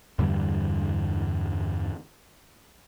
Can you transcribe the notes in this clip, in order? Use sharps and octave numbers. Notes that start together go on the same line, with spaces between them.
E2 G2 D3 G3